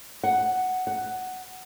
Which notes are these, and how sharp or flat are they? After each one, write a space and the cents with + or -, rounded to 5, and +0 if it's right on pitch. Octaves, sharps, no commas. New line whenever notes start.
F#5 +5
F#5 +5